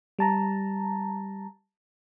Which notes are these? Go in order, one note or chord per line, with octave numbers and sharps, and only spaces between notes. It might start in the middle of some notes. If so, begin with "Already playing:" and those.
G3 A5 A#5